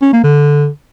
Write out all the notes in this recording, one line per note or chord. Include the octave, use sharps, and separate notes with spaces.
C#4
A#3
D3